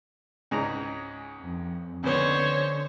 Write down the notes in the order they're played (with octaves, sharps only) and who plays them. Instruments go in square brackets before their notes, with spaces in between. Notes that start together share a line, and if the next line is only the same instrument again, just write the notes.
[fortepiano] C#2 G#2 A#5
[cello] F2
[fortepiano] C#2 B3 [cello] D3 [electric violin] C5 C#5